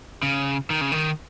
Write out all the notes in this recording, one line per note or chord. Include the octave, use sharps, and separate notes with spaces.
C#3
D#3
C#3
D#3